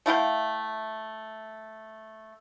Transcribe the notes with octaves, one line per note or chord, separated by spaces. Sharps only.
A3 E4 F5 G5